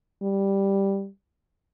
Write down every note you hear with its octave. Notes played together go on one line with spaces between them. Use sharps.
G3